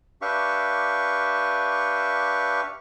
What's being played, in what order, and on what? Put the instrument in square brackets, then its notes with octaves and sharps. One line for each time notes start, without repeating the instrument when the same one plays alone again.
[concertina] D4 G4 B4 E5 F5 C#6